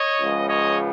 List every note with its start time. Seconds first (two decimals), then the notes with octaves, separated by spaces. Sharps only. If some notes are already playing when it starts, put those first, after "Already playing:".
Already playing: C#5 D#5
0.20 C#2 C#3 F3 G#3 B3
0.48 C#5 D#5